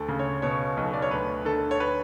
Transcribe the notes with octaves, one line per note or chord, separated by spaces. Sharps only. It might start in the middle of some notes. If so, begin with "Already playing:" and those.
Already playing: D2 A4
C#3
C#5
B2 C#5
B1
D5
C#5
D2 B4
D3 A4
C#5
B4